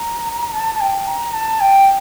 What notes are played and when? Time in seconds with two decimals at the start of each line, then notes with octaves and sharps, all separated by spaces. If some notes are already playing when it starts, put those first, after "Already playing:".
Already playing: A#5
0.53 A5
0.75 A5
0.80 G5
1.07 A#5
1.33 A5
1.60 G5